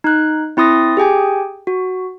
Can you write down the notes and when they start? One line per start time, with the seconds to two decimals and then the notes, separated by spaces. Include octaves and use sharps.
0.04 D#4 F#6
0.57 C4 E4 C6 D#6 A6 A#6
0.97 G4 G#4 G5 G#5
1.67 F#4